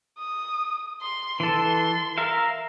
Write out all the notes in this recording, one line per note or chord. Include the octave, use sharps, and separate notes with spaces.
D#6
C6
E3 A4 C6
A#4 E5 F5